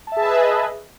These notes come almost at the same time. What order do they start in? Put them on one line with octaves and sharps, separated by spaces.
A5 E5 G#4 B4 D#5